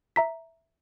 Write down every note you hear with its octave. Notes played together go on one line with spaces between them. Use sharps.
E5 A#5 B6